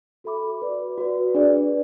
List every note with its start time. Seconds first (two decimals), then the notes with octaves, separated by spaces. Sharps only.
0.24 F#4 A4 E5 B5 D6
0.61 F#4 B4 D5
0.98 F#4 B4 D5
1.35 D4 G#4 B4 D5